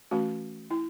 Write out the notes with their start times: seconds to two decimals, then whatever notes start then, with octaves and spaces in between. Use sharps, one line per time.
0.11 E3 A3 C#4 F#4
0.71 E4